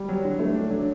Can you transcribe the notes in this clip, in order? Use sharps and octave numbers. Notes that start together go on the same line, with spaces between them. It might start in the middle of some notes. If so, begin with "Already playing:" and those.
Already playing: G3
F#3
D3
A3
D4
F#3